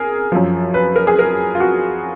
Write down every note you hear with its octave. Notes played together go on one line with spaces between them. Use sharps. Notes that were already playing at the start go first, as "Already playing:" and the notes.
Already playing: G#4 A#4
F#2 F3
B4
A#4
G#4
A#4
F4
F#4